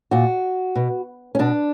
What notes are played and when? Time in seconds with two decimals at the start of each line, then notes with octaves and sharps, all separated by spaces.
0.11 A#2 F#4
0.75 B2
1.35 C#4
1.39 B2 D4